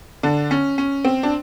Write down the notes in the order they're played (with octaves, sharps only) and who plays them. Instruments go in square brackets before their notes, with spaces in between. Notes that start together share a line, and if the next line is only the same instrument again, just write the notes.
[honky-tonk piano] D3 D4
C#4
C#4
C4
D4